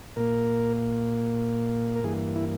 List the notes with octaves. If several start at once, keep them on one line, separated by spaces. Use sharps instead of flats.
A#2 A#3 A#4
A#4
G2 E3 A#3 G#4
E4